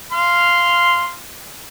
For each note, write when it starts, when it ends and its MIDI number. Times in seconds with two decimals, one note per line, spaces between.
0.12 1.15 77
0.12 1.15 84
0.12 1.15 89